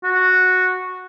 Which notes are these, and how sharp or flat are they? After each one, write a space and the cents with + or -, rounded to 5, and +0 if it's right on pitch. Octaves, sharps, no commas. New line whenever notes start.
F#4 -5